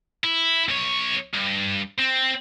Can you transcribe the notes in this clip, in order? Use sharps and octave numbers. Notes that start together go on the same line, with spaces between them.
E4
B1 C#5
G2
C4